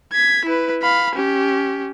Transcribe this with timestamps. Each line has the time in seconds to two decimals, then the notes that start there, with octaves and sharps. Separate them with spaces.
0.13 G#6 B6
0.45 E4 B4
0.82 F5 B5
1.15 C#4 G4